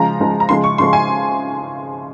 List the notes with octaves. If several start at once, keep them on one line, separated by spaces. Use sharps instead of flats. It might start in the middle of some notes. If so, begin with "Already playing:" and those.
Already playing: C#3 F3 G#3 A#5
C#3 F3 G#3
A#5
C#3 F3 G#3 C6
C#6
C#3 F3 G#3 C6
G#5